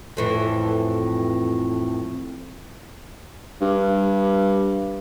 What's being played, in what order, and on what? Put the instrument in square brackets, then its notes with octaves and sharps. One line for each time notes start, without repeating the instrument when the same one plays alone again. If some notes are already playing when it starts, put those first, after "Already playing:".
[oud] F2 A2 E3
[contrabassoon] G2